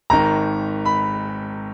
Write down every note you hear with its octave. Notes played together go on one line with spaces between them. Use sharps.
G#1 G#2 D#3 A#5
B5